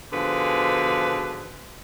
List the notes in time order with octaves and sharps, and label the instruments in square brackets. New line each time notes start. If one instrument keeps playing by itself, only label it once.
[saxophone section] G#2 B2 D3 F3 G#4 B4